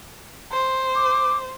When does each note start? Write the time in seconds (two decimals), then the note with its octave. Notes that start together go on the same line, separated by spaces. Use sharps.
0.52 C5
0.95 D6